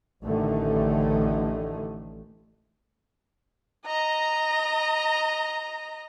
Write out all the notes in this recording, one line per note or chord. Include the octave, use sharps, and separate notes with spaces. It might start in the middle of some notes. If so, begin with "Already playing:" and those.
A1 D3 D#3 A3
D#5 A#5